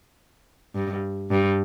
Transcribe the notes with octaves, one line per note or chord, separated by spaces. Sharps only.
G2
G2